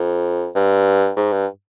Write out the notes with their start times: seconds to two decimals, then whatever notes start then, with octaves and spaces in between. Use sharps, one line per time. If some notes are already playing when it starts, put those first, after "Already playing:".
Already playing: F2
0.55 G2
1.16 G#2
1.32 G2